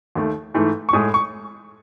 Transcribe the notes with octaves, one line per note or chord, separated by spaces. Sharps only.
D#2 D#3 A3
G#2 E3 A3
C#6
A2 G#3 D#6
C#6